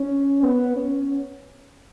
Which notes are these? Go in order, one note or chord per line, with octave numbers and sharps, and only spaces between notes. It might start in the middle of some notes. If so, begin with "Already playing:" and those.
Already playing: C#4
B3
C#4